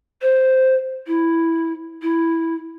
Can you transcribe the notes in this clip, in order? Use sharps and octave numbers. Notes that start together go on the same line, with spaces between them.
C5
E4
E4